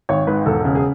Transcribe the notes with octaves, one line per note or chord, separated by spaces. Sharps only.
G#1 C#5
G#2 B4
E1 A4
C#3
G#4